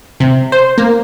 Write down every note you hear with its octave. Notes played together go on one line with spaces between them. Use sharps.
C3
C5
A#3